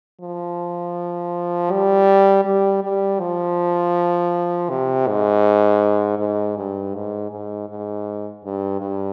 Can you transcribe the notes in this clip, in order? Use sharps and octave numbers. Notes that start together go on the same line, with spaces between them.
F3
G3
G3
G3
F3
C3
G#2
G#2
G2
G#2
G#2
G#2
G2
G2